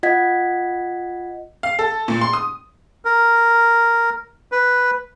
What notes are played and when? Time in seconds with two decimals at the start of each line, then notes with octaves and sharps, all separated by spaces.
0.03 F4 D#5 F#5 G#6 B6
1.63 F5
1.79 A4
2.08 A#2
2.21 C6
2.33 D#6
3.05 A#4
4.52 B4